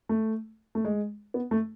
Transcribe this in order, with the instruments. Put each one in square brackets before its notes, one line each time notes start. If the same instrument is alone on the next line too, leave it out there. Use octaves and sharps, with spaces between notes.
[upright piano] A3
A3
G#3
B3
A3